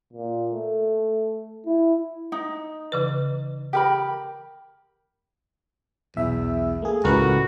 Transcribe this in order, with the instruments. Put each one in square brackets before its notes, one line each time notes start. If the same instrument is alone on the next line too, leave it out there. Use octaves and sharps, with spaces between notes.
[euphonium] A#2
A3
E4
[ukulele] D#4
[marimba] C#3 E3 B4
[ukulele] G4 A#4 B5
[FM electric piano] B1 E5 [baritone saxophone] E2
[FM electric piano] A3 A#3 G#4
[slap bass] C#2 [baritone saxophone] A2 [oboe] F#4 [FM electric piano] A#4 B4